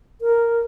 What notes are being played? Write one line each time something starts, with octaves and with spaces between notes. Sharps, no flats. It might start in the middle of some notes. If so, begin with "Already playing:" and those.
A#4